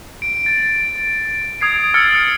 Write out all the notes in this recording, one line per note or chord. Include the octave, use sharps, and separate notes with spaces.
D7
A6
D#6 G#6 C7 D7
E6 F6 A6 C#7